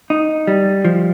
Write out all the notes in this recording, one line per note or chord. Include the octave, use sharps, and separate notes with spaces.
D#4
G3
F3